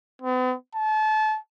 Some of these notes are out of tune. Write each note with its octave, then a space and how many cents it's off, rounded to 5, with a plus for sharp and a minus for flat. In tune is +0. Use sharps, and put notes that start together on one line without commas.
B3 +45
A5 -30